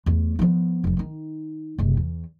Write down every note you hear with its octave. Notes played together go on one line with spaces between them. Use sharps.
E2 A3
F3 B3
F1 F3
D#3 D#4
F#1 C2
E2